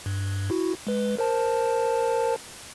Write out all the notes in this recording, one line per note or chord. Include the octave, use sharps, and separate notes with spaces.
G2
E4 F#4
G#3 B4
A#4 C5 A5